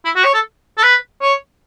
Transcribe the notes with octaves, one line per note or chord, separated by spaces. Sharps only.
E4
F#4
C#5
A4
A4
B4
C#5